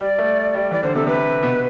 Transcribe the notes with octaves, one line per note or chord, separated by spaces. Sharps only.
G3 D5
A3
G3
E3 D5
D3 C5
C3 A4
C3 B4
B2